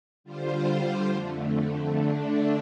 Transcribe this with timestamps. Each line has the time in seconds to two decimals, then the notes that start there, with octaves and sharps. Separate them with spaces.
0.24 D3 G3 F4 C5
1.09 F2 D3 A3
1.93 D3 A3 D4